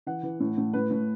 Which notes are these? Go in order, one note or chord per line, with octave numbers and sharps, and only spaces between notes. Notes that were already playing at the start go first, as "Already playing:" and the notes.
E3 F#5
E3
A2
A2
A2 B4
A2